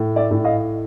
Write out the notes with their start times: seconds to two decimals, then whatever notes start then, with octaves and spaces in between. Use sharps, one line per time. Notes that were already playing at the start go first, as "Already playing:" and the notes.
Already playing: A2
0.16 D5 E5
0.31 A2
0.45 D#5 F5